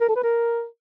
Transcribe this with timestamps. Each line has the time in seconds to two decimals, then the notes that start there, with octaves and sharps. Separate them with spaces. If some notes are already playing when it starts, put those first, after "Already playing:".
0.01 A#4
0.08 A4
0.16 B4
0.24 A#4